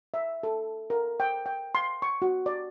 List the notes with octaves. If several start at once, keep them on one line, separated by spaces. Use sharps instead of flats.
E5
A4
A#4
G5
G5
C6
C#6
F#4
D5